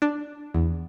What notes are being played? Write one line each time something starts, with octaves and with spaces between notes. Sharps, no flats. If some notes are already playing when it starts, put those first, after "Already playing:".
D4
E2